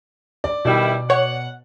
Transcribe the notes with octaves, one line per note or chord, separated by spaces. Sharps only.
D5
B2 D#3 G3 E4
C#5 F#5